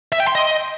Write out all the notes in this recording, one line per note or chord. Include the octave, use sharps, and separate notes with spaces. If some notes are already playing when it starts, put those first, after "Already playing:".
E5
G5
C6
D#5